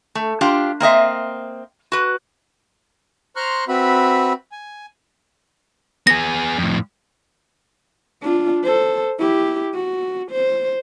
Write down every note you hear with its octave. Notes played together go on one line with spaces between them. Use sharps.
A3
D4 F4 G4
A#3 C4 D#5 E5
F#4 B4
C5 A#5 C6 C#6 F6 F#6
C4 F#4 B4 E5 B5
G#5
B3 G#4 A#6
F2 A2
D4 F4
A4 C5
E4 G4
F#4
C5